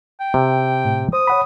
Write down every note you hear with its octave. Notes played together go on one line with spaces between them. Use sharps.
G5
C3
A2
C5 D#6
C#5 F#5 B5